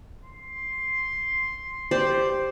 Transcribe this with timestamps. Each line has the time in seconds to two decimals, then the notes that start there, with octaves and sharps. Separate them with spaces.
0.25 C6
1.91 G4 C5 D5